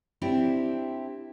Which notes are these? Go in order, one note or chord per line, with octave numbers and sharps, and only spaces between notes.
C4 D4 E4 G4